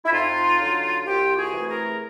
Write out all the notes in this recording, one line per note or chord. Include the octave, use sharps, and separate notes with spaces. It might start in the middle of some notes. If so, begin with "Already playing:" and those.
E4
F2 D#4 F4
D3 F#3
C2 F4 G4
F#4 G#4
C3 E3 A3
G#4 A#4